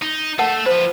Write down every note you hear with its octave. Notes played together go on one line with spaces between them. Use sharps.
D#4
A3 A4 A#4 F#5 A5
F3 B4 C5